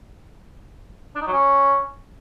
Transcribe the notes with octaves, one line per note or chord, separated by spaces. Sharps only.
D4
D#4
F#3
C#4